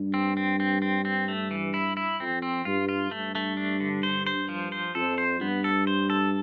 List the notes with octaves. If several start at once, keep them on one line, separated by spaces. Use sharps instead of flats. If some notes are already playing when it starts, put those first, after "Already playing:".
Already playing: G2
C4
C4
C4
C4
C4
A3
E3
E4
E4
F2 C4
C4
G2 F4
F4
G2 A3
A3
D4
D3
C5
C5
F3
C5
F2 A4
C5
G2 B3
A4
C5
A4